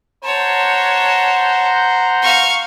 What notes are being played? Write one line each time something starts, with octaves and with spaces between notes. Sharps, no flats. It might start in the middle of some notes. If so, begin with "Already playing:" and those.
C5 C#5 F#5 A5 A#5
F5 C#6